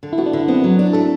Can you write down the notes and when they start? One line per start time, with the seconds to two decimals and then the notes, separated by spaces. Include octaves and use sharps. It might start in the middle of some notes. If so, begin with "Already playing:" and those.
0.03 D3
0.13 E4
0.18 B3 F#4
0.26 D4
0.33 D3 E4
0.48 B3 C4
0.64 F#3
0.79 D4
0.93 A3 A4